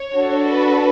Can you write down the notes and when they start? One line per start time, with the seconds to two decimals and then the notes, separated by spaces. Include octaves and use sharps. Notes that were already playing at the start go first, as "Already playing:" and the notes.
Already playing: C#5
0.15 D4 F#4 A4
0.47 B4